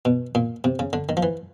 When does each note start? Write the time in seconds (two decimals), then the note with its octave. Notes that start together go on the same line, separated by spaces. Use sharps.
0.05 B2
0.35 A#2
0.64 C3
0.79 C#3
0.93 D3
1.09 D#3
1.17 F3
1.23 E3